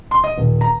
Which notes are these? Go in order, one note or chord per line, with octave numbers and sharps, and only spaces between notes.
C6
D#5
D#1
A#5